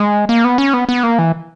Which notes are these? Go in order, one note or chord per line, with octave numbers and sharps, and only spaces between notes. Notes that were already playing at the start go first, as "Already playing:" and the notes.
Already playing: G#3
A#3
B3
C#4
B3
B3
A#3
E3